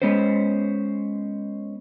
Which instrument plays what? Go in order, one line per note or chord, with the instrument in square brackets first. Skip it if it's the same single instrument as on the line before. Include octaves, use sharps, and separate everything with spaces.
[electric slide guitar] G#3 B3 C#4 C5